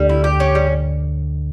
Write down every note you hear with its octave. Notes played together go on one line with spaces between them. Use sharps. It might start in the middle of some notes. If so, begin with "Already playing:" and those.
Already playing: D2 D3 G3
E4
G4
C#4
G3